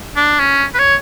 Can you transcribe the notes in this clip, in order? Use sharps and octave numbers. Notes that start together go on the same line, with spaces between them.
D4
C#4
B4
C#5